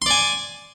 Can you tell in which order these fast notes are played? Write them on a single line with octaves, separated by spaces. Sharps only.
C6 D5 G#5